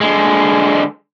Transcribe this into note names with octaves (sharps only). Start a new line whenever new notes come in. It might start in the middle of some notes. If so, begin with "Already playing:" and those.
D3 G#3